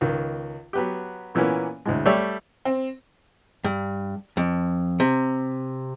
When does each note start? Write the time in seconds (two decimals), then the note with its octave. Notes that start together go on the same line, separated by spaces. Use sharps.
0.01 C#2 D#3
0.73 F#3 B3 G4
1.35 A#2 E3 A#3 B3 C#4
1.85 D2 A2 G#3
2.06 G3 A3 C#5 D5 E5
2.65 C4
3.64 G2
4.37 F2
5.00 C3